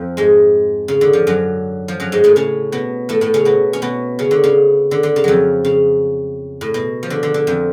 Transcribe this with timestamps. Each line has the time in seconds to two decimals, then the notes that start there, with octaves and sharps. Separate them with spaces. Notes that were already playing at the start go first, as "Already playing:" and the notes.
Already playing: F2 F3
0.17 G#2 G#3
0.88 C#3
1.01 D3
1.13 F3
1.27 F#2 F#3
1.88 F3
2.00 F#2 F#3
2.12 G#2 G#3
2.24 A2 A3
2.36 C#3 C#4
2.72 B2 B3
3.09 A2 A3
3.21 A2 A3
3.34 C#3 C#4
3.45 B2 B3
3.73 C#4
3.82 B2 B3
4.19 C#3 C#4
4.31 D3
4.44 C#3
4.91 D3
5.03 D3
5.16 C#3
5.24 F2 F3 F#3
5.65 C#3
6.61 A2
6.74 B2
7.03 F3
7.10 D3
7.23 D3
7.34 D3
7.47 F2 F3